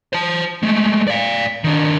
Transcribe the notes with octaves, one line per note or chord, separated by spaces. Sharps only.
C5 A5
G#3 A3
D5 F5
D#3 D4